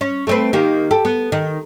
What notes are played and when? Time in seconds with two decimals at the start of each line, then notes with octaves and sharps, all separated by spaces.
0.01 C#4
0.27 A3 C4 B4
0.53 D#3 A#3 G4
0.91 G4 A4
1.05 B3
1.32 D#3